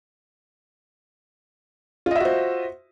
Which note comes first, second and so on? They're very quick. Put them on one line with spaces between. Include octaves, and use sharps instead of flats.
F4 D#5 E5 F#4 C5